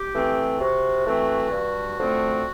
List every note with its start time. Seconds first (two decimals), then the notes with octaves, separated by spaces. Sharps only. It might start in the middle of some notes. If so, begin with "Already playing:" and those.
Already playing: G4
0.13 E3 A3 C4
0.59 C3 F#4
1.05 E3 A3 C4
1.51 G2
1.98 D3 F3 A3 C4